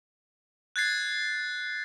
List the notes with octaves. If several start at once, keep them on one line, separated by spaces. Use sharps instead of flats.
F#6 G#6 A6 C7